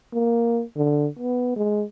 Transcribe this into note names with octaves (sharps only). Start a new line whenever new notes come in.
A#3
D3
B3
G#3